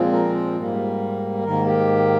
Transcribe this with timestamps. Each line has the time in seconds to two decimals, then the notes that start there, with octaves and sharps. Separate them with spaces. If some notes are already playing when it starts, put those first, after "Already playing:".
Already playing: A#2 F3 G#3 C4
0.12 A#4
0.34 C5
0.56 G#2 G3 A#3
1.44 G#2 D#3 A#3 A#4
1.66 G4